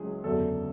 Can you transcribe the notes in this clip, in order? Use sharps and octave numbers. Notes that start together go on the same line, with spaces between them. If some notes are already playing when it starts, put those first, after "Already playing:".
Already playing: C#2 F#3 E4 G#4
F#1 E2 D3 F#3 A4